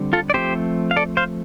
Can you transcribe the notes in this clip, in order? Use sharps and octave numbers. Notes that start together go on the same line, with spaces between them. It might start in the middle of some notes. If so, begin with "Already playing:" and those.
Already playing: D3 G3 C4
F4 A4
D5
F3 A3 C4 G4 C5
F5
A4 D5
C5 F5